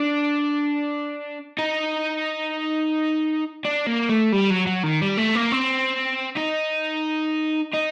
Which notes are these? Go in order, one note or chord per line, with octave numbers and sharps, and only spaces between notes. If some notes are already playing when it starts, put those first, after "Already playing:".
Already playing: D4
D#4
D4
A#3
A3
G3
F#3
F#3
D#3
G3
A3
A#3
C4
D#4
D#4